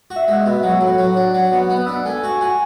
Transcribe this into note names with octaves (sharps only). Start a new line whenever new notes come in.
F#4
E5
G#3 F#5
E5
B2
E5
F#3 F#5
A2
F#3
D4
F#3
B2
B3
D4 E5
F#5
A3 G#5
F#4
F#4 G#5